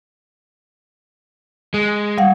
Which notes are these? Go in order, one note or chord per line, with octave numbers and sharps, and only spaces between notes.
G#3
G3 F5 F#5